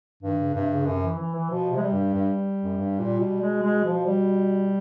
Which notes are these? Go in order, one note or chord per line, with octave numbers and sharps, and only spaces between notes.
G2 D#3
C#3
G2 C3
C#3
F#2 C3
E3
E3
E3
B2 F3
C3
G#3
G3
G2
G2
F#2
G2
A#2
B2
G#3
G#3
F3
G3